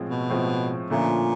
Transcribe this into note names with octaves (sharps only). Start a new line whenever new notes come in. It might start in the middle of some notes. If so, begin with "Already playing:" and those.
Already playing: A2 F3 G#3 C4
B2
A2 F3 G#3 C4
A#2 D3 F3 A3 C#4 F4